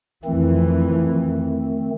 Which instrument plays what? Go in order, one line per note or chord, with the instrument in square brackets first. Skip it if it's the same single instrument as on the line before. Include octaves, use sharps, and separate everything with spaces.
[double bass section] F2 E3 [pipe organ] D#3 A3 C4